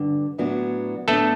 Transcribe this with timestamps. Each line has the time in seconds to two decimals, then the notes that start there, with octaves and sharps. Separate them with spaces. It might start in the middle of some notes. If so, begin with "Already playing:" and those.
Already playing: G2 D3
0.38 A2 F#3 B3 D4 F#4
1.08 A2 F#3 A3 B3 D4 F#4 A4